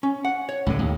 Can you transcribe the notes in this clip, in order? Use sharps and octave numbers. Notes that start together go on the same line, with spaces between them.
C#4
F#5
C#5
C#2 A2 D3
D#2